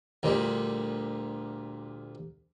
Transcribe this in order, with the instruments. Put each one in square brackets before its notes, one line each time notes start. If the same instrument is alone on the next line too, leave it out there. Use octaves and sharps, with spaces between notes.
[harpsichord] D2 A#2 G3